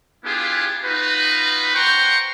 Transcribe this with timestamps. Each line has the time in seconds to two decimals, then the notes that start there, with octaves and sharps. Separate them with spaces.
0.24 B3 D4 E4 F4 G4 G#4
0.84 D#4 F4 F#4 B4
1.74 C5 F#5 G5 A#5 C6 C#6